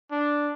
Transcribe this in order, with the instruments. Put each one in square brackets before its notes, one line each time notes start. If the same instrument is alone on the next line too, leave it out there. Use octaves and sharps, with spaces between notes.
[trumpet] D4